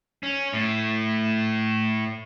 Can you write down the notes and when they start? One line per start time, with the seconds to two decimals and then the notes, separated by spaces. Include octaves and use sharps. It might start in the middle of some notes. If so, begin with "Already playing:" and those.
0.23 C#4
0.53 A2